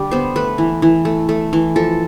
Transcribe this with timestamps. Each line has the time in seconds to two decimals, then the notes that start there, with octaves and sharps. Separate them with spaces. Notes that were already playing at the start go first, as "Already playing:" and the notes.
Already playing: D3 G3 G4
0.11 B3 C5
0.36 A3 B4
0.58 E3
0.82 E3
1.05 A3
1.29 A3
1.53 E3
1.76 F3 A4